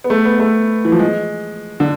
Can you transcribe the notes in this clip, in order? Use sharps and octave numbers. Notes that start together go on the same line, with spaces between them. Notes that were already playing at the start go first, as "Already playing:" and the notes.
B3
A3
B3
A3
E3
F3
G#3
D3